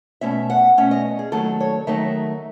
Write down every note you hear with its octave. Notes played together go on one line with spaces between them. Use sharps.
B2 A3 C#4 E5
F#5
B2 A3 C#4 E5
D#5
G#4
D#3 F#3 A3 D#4 A4
C#5
D#3 F#3 A3 D#4 E5